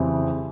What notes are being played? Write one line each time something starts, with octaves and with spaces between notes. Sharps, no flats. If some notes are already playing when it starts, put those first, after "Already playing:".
Already playing: F2 C#3 E3 G3 C4